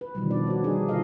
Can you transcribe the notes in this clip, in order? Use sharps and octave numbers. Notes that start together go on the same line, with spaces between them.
B4
B2 D3 D#3 F3 G3
B3 D4 D5
F#4 C#5
G3 D4 D#4 G#4
A#2 D3 F4 A4 D#5 F5